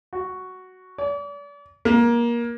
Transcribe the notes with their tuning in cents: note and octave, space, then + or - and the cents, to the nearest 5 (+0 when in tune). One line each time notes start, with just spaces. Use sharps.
F#4 +5
D5 -40
A#3 +20